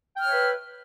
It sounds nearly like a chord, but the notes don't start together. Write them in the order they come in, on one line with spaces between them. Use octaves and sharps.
G5 F6 C#5 E5 B4